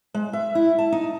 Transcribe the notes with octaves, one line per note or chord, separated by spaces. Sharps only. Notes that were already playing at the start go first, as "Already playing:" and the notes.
G#3
E5
E4
A5
D#4